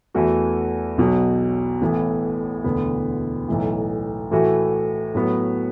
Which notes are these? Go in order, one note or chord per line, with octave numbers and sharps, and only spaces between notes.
E2 E3 A3 F#4
B1 B2 F#3
A1 A2 E3 B3
E1 D2 D3 B3
B1 A2 E3
A2 E3 A3 F#4
A2 F#3 B3 F#4